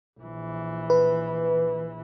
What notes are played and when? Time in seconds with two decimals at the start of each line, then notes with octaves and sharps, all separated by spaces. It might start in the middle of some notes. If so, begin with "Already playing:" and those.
0.19 A#1 E3
0.90 B4